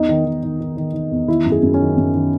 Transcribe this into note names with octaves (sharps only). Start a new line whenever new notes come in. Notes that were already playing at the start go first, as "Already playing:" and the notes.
Already playing: E2 D#4
D#3
D#3
D#3
D#3
D#3
D#3
E2
D#3 E4
F#2
G#4
F#2
C#4
D#3
F#2
D#3